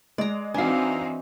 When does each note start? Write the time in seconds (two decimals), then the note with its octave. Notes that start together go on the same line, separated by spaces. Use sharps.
0.18 G#3 D5 A#5
0.54 E3 C4 D4 D#4 F#4 F5 G#5